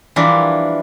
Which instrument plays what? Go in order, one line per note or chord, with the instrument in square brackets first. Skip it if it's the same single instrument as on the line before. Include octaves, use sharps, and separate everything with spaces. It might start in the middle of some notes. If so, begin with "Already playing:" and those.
[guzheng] E3 F3 G3 D4 E4 A#4